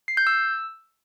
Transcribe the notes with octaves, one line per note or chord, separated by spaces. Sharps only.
C7
G6
E6